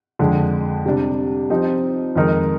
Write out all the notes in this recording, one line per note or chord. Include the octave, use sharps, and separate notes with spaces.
F2 D3 G#3
C3 G3 D4
F3 C4 D#4 G4
F2 D#3 G#3 D#4 A#4